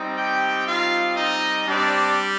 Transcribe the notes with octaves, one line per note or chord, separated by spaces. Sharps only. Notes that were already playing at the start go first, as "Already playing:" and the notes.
Already playing: G3 C4 D#4
G4 G5
F4 F5
D#4 D#5
G3 C4 D4 G4 D5